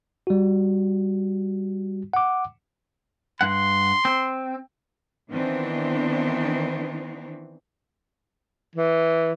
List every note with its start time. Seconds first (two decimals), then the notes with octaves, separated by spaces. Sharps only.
0.27 G3 F#4
2.13 F#5 D6
3.41 G2 F#5 C6
4.05 C4
5.30 D#3 E3 B3 C4 D4
8.75 E3